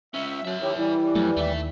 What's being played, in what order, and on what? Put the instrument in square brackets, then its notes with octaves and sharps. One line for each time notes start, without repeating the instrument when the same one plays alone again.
[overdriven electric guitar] G#3 C#4 [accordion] E5
[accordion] F#3 [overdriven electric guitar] A#4 E5
[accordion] D#3 E4 G4 [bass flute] C#5
[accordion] E3 G3 [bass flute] E4
[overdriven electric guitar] F2 [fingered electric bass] F#3 A3
[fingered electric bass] D#2 [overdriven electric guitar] A3 E5